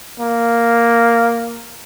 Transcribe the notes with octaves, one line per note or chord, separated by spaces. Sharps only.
A#3